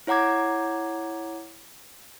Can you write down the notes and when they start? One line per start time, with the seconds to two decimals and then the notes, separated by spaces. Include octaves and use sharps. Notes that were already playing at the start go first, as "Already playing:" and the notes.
0.07 E4 C#5 F#5 A#5 D6 G#6